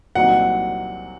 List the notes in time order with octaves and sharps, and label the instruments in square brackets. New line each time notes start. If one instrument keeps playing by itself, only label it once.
[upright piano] C2 A#2 F#3 C4 D#4 [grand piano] F#5